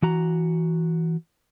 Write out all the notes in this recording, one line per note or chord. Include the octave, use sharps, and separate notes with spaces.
E3 F#4 A#5